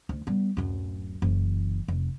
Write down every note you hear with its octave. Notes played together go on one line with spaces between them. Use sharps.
D2
G3 B3
D1 F#2
F#1 E3
F1